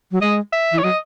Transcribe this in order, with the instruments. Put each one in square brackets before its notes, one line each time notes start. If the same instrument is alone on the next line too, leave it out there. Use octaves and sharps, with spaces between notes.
[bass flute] F#3
[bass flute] G#3 [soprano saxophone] D#5
[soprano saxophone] E5
[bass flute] E3
[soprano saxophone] C#5
[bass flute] F#3 [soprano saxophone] D#5